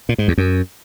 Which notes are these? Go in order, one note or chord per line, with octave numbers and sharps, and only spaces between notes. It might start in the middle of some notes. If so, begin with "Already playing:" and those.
A#2
G#2
E2
F#2